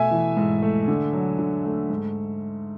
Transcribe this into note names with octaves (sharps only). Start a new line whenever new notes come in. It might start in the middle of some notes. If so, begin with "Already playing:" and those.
Already playing: B2 A3 E5 G#5
E3
G#2
A3
D3
F#3
D3
A3
G#2